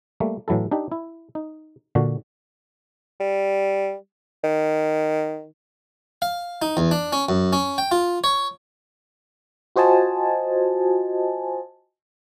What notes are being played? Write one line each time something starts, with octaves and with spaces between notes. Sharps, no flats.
G3 A3 A#3
A2 E3 F#3 E4 A4
D4 D#4 G4
E4
D#4
A#2 D3 D4 F#4
G3
D#3
F5
D#4
E2
D4
C#4
F#2
C#4
G5
F4
C#5
F4 F#4 C5 D#5 G#5 A5